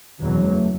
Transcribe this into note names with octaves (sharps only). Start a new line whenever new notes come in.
F#1 E2 B2 D#3 F#3
E3
G#3
A3